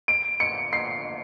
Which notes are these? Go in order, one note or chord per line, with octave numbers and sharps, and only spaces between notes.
D7
C#7
C7